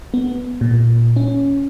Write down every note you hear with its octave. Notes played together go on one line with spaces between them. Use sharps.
B3
A#2
C#4